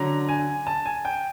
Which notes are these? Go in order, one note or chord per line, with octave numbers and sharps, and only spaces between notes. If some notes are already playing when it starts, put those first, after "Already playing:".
Already playing: D3 F#3 A#5
G#5
A5
G#5
G5